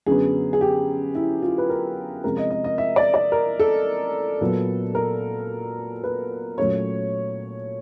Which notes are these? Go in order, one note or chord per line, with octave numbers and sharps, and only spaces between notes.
F#2 D3 F#3 B3 G#4
G#4
G4
E4
F4
B4
A#4
C3 F3 G#3 C#4 A#4
D#5
D#5
D#5
E5
D5
D5
A#4
A4
A#2 F#3 B3
A#4
B4
A#2 F#3 A3 C#4 C#5